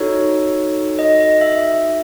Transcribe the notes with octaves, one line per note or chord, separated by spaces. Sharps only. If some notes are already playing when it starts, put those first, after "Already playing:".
Already playing: D#4 F#4 A4 C#5
D#5
D#5
E5